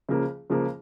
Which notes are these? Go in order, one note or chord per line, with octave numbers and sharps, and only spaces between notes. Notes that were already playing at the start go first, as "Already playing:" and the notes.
C#2 C#3 F3 A#3
C#2 C#3 F3 A#3